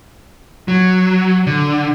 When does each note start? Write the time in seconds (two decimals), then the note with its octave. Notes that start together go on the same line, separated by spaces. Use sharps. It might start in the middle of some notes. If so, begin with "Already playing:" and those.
0.68 F#3
1.47 D3